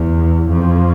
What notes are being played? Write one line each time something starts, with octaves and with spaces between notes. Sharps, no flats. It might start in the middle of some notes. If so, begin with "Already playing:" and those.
Already playing: E2
F2